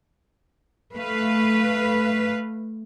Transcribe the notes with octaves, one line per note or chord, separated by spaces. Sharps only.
A3 B4 F5